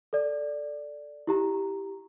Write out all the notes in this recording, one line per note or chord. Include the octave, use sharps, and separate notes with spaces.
A4 D5
E4 G4 A#5